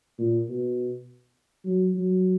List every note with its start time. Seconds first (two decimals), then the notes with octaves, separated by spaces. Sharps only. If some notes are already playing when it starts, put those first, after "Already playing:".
0.19 A#2
0.49 B2
1.65 F#3
1.95 F#3